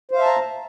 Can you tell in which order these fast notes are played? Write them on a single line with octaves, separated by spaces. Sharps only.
C5 F5 E5 A5 A#5